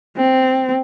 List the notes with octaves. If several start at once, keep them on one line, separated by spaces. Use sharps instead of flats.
C4